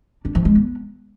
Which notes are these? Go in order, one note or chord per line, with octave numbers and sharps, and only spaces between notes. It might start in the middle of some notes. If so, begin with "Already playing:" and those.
D4
F3
G#3
B3